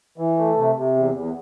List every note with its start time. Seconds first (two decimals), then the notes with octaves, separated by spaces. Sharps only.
0.18 E3
0.37 A3
0.56 C3
0.76 C3
0.95 E2
1.14 E2